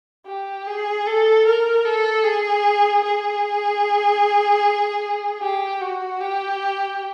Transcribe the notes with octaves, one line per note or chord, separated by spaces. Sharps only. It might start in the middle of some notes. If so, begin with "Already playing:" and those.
G4
G#4
A4
A#4
A4
G#4
G#4
G4
F#4
G4